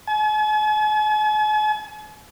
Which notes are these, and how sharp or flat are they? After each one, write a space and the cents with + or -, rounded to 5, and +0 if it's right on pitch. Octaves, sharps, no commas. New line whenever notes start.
G#5 +45